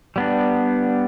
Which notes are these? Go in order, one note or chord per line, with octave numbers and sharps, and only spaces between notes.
G3 B3 D4